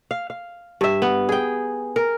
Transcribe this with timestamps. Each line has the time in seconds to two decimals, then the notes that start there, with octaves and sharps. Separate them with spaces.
0.11 F5
0.30 F5
0.81 G2 E5
1.02 B3
1.29 G#4 G5
1.96 A#4